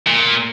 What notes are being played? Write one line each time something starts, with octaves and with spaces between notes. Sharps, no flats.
A#2